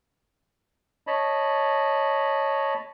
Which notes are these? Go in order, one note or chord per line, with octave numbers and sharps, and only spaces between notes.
C#5 D#5 A5 B5